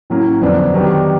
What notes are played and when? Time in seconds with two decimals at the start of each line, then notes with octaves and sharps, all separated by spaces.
0.10 A2 F#3 A#3 C#4
0.42 F2 D3 F#3 B3 D4
0.74 D#3 F#3 B3 D4 G4